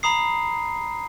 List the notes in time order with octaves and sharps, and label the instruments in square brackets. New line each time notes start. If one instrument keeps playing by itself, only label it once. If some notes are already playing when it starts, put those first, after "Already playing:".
[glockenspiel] A#5 B5 D#6 C7